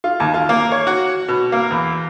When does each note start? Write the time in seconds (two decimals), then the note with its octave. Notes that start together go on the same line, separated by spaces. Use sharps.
0.04 F4
0.20 D#2
0.34 F4
0.49 A#3
0.72 C#5
0.87 F#4
1.28 B2
1.52 A#3
1.71 E2